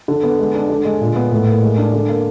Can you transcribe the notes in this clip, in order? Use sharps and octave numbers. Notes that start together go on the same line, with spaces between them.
D3
B3
G#3
D4
D3
G#3
A#2
B3
A2
A#3
G#3
D4
D3
A#3